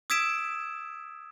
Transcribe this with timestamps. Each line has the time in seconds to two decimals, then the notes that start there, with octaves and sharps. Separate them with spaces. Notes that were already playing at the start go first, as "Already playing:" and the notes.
0.10 D#6 E6 G#6 B6 D7 E7